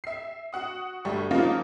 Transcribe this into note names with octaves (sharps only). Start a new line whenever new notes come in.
E5 C7
F#4 F#5 D#6
G1 G3 A3 C#6
C#3 F3 A#3 D#4 F4 F#4